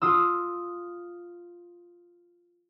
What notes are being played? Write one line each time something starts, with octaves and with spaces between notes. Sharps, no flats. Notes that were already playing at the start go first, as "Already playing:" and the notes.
F4 D#6 E6